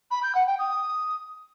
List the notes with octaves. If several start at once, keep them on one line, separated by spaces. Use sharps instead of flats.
B5
G6
F#5
G5
D#6